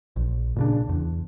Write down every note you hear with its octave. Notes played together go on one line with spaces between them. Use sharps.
A#1
A#2 C#3 D4
E2